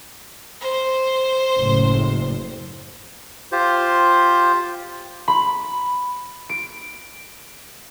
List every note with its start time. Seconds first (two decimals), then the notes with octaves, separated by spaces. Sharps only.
0.61 C5
1.57 F#1 A2
3.52 F4 G4 C5
5.28 B5
6.49 D7